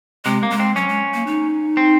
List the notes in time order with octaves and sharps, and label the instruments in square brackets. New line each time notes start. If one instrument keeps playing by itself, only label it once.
[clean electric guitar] C3 [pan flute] G#3
[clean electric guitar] A#3
[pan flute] G#3
[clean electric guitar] C4
[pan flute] F#3 [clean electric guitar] C#4
[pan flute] G#3
A#3
D#4
[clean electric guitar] C4